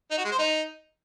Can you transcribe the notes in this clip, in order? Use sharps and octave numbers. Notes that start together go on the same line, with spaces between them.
D#4
F#4
G#3
C5
D#4